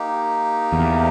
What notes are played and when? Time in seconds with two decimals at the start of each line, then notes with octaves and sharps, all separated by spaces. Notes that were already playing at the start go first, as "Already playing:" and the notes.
Already playing: A#3 D#4 G4
0.72 E2